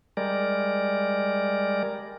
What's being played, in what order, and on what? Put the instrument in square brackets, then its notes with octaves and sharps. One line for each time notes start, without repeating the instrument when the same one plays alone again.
[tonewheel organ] G3 G#3 A#4 D5